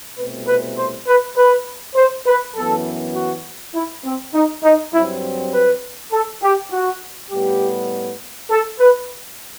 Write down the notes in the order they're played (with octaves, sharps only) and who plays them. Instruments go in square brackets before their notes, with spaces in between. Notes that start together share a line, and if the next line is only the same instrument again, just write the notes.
[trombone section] C2 B2 A3 C4 B4
B4
C5
B4
B4
C5
B4
F#2 E3 B3 A4
F#4
E4
C4
D#4
D#4
G2 F#3 C4 E4
B4
A4
G4
F#4
A2 G3 B3 G4
A4
B4